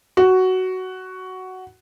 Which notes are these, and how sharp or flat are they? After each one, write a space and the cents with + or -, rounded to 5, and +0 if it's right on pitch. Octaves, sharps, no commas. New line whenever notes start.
F#4 +10